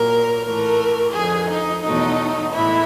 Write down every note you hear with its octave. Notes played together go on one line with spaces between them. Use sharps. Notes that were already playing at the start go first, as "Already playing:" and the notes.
Already playing: A#2 F#3 A#3 A#4
A2 E3 A3 A#4
F2 D3 F3 G#4
D#4
E2 B2 F#3 A3 D#4
A2 E3 G#3 E4